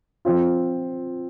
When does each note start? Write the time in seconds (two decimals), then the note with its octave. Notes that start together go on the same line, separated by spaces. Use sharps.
0.25 F3 C4 F4